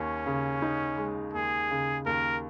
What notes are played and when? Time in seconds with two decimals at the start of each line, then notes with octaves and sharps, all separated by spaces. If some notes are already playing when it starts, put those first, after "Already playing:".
Already playing: D#2 C#4
0.26 C#3
0.62 D#4
0.98 G#3
1.34 D#2 G#4
1.71 C#3
2.06 D#2 A#4